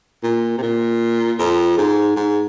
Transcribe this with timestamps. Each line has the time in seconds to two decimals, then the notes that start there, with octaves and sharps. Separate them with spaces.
0.23 A#2
0.58 C3
0.62 A#2
1.39 F2
1.78 G#2
2.16 G#2